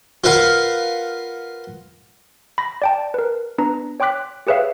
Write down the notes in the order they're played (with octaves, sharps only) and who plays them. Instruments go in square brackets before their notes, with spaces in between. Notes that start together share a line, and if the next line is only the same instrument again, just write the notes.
[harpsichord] F4 A#4 B4 F5 F#5
[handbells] B5 A#6
D5 G5 A5
A#4 B4
B3 D4 B4 A#5
C#5 G5 C6 D6 F#6 B6
G4 G#4 B4 C#5 E5 F5